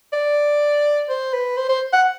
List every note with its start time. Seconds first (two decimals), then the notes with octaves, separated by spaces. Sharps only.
0.13 D5
1.09 C5
1.33 B4
1.57 C5
1.69 C5
1.93 F#5